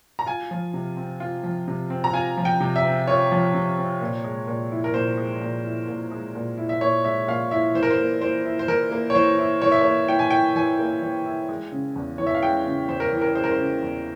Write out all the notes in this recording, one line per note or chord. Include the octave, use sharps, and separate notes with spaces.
A#5
F4 G#5
F3
C3
C4
F4
F3
C3
C4
A#5
F4 G#5
F3
G5
C3
E5
C4
F4 C#5
F3
C3
C4
A#2
G#3
A#2
E4
A#4
A#2 C5
G#3
A#2
E4
A#2
G#3
A#2
E4
E5
A#2 C#5
G#3 E5
A#2 F5
E4 E5
E3 C5
A#4
C5
A#3
E3 C5
E4
C5
E3 A#4
A#3
C#5
E3 C5
E4
E3 C#5
E5
A#3 C#5
E3 G5
G#5
E4 G5
E3 G#5
A#3
E3
E4
G#3
C#3
E2
E3 C#5
E5
F5
G#3 G5
C#3
E2 C5
A#4
E3
A#4
G#3 C5
A#4
C5
C#3
E2